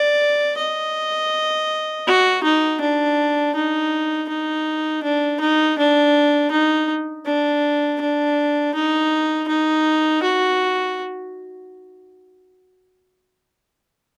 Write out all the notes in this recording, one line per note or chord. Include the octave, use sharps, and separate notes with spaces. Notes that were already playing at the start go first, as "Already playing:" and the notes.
Already playing: D5
D#5
F#4
D#4
D4
D#4
D#4
D4
D#4
D4
D#4
D4
D4
D#4
D#4
F#4